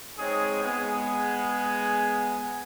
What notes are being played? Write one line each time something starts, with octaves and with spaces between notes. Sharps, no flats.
G#3 C4 D#4 G#4 C#5 D#6
G#3 B3 G#4 G#5